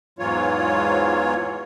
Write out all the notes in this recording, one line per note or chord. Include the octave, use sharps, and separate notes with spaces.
E2 G#2 E3 F#3 F4 C#5